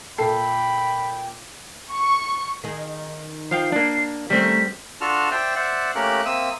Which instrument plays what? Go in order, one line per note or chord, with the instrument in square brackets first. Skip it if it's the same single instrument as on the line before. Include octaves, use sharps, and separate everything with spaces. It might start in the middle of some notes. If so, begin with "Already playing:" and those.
[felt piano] A#2 E5 C7 [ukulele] A4 [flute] G5 [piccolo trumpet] B5
[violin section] C#6
[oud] D#3 D#4 G#4
[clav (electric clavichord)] F3 F5 G5 [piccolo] C7
[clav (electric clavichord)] A#3 D4
[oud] D#3 A3 C#4 [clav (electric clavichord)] G3 C4 [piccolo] B6
[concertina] D4 F4 F#4 A4 A5 F6
C5 D5 E5 G5
C5 D5 E5 F#5
A3 A#3 C#4 G4 A#4 F#6
A#3 C4 E5 D#6 E6